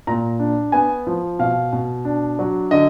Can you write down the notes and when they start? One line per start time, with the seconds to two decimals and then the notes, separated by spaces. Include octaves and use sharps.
0.07 A#2 A#5
0.39 D4
0.72 B3 G#5
1.07 F3
1.39 B2 F5
1.72 B2
2.05 D4
2.39 F#3
2.71 D3 D#5